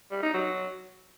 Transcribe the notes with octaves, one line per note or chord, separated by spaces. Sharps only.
G3
D#4
F#3